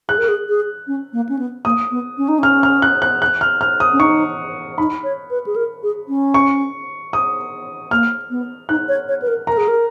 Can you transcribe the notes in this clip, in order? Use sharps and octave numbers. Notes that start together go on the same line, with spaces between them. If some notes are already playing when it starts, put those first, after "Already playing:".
G#4 F#6
A#4
G#4
G#4
C#4
A#3
C#4
B3
A#3 D#6
B3
C#4
D#4
C#4 F6
F6
F#6
F#6
F#6
F6
F6
D#6
C#4
D#4 C#6
D#4 B5
C#5
B4
G#4
A#4
G#4
C#4
C#6
D#6
A#3 F6
B3
D#4 F#6
C#5
C#5
B4
A#4
A#4 A#5
G#4
A#4